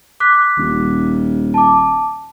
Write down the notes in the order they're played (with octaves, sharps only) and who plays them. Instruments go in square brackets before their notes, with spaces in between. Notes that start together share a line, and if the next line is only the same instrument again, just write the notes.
[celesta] D6 F#6 B6
[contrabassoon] D#1
[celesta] A5 D6